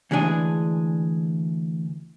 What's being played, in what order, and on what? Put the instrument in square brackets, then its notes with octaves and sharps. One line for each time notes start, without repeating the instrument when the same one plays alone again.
[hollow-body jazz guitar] D2 E3 G#3 D4 G#4